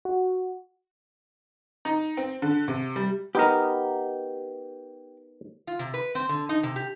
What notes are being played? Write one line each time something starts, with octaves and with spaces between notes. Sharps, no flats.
F#4
D#4
C4
D3
C3
G3
B3 D#4 G4 A#4
F4
C3
B4
C4
D3
D#4
C3
G4